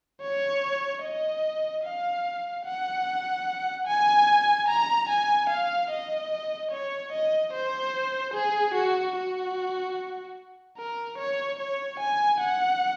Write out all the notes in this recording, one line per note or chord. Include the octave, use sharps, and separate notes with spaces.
C#5
D#5
F5
F#5
G#5
A#5
G#5
F5
D#5
C#5
D#5
C5
G#4
F#4
F#4
A#4
C#5
C#5
G#5
F#5